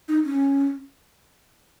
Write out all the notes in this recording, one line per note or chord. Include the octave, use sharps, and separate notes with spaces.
D#4
C#4